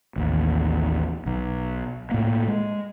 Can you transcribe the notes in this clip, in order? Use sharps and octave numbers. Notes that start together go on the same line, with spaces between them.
A1 D#2
B1
A2 A#3
G#3